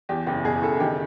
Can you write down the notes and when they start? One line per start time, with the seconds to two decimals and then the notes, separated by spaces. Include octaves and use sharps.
0.09 E2 G4
0.27 F#1 G4
0.44 B2 G#4
0.62 F#1 A4
0.80 D#3 G4